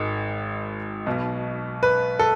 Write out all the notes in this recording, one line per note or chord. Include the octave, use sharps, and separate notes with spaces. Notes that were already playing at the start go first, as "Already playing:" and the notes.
Already playing: G#1 G#2 D#3
B1 B2
B4
A4